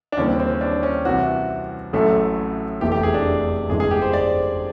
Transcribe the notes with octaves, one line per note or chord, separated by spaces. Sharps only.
D4
D#2 C#3 E3 G3 C#4
C4
C4
C#4
D4
C#4
C2 C3 E3 F#4
A1 A2 F#3 A3
F1 E2 C3 E3 A3 G4
G4
G#4
D4
G1 F2 C#3 E3 G#3 G#4
G#4
G4
C5
D5